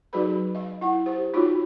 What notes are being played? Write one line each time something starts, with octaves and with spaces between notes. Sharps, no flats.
F#3 D#4 F#4 G#4 B4 B5
D#5 F5
E4 F#5
G4 C5
D#4 F4 F#4 C#5